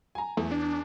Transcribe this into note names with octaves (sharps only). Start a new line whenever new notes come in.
G#5 A#5
E2 A3
D4